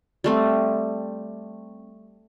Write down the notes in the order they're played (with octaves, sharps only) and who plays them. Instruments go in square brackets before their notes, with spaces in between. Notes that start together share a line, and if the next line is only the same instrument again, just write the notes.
[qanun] G3 A3 C4